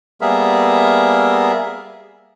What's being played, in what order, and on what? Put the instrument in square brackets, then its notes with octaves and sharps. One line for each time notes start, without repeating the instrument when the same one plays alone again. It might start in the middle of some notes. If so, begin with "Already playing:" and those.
[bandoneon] G3 A#3 B3 G#4 A#4 E5